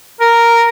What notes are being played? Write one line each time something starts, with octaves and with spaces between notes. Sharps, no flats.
A#4